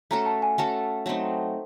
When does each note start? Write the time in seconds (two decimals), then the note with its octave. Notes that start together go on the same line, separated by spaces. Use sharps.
0.11 A3 C#4 F#4 A4 A#5
0.26 A5
0.42 G#5
0.58 A3 C#4 F#4 A4 A5
1.06 F#3 A3 C4 D#4